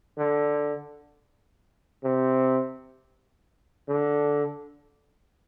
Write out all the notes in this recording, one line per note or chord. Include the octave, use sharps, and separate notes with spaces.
D3
C3
D3